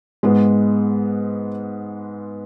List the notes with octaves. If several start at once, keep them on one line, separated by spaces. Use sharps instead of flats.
G#2 G#3 B3